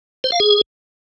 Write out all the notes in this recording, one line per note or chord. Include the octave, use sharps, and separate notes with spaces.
C5
F5
G#4